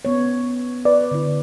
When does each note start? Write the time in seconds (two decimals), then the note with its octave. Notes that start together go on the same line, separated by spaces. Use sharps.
0.05 B3 C#5
0.85 B4 D5
1.11 D3 E4